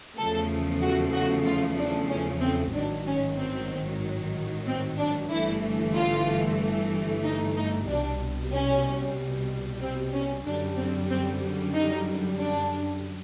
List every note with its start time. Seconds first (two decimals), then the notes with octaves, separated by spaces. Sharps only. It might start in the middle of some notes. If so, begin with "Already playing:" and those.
0.18 E2 C#3 F3 A3 A4
0.82 F#4
1.14 F#4
1.46 F4
1.78 D4
2.10 C#4
2.41 C4
2.74 A1 G#2 D#3 F#3 D4
3.07 C#4
3.38 C4
4.67 C4
4.99 D4
5.31 G1 G2 E3 A3 E4
5.96 F4
7.25 D#4
7.56 D#4
7.88 C2 B2 G3 D4
8.53 C#4
9.81 C4
10.14 C#4
10.45 F#2 D3 G3 D4
10.77 C4
11.10 C4
11.74 D#4
12.38 D4